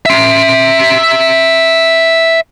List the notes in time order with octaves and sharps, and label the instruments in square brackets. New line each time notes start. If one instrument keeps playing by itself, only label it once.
[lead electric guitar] E5 C6